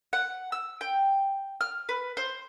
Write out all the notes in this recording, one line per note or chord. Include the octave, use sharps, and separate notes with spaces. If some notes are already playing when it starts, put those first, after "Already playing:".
F#5
E6
G5
F6
B4
C5